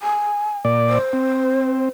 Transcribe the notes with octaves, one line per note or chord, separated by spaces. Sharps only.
G#5
A#2 D5
C5
C4